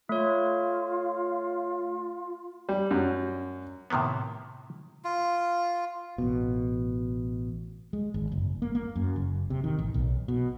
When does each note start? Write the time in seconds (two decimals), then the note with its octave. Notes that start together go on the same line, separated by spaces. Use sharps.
0.09 A3 F4 C#5
2.69 G3
2.91 F#2
3.90 A2 C3 D#3 A#3 B3
5.04 F4
6.18 A1 B2
7.93 G#3
8.14 G#1
8.32 F#1
8.62 A#3
8.75 A#3
8.96 F#2
9.16 F#1
9.50 C3
9.64 D#3
9.79 A1
9.94 B1
10.28 B2